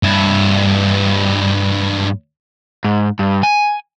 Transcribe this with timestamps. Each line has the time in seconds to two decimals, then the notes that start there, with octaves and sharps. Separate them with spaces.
0.03 G2 E4
2.84 G#2
3.19 G2
3.43 G#5